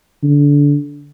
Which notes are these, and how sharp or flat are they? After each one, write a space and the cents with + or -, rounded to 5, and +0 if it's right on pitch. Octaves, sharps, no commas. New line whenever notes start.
D3 -20